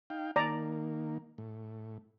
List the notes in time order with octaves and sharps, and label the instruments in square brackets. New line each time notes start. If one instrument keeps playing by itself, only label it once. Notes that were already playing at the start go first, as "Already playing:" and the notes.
[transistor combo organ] D#4 F5 G5
[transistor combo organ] D#3 A#3 [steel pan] D5 A#5
[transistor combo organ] A2